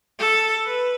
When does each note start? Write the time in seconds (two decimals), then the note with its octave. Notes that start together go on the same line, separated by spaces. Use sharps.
0.19 A4
0.66 B4